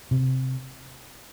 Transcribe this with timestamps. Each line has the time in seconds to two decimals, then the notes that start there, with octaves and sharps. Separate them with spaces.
0.11 C3